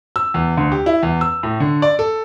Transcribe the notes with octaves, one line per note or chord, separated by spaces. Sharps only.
E6
E2
D2
G4
E4
E2
E6
A2
D3
D5
A4